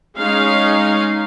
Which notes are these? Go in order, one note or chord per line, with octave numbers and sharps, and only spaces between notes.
G#3 C#4 D#4 F5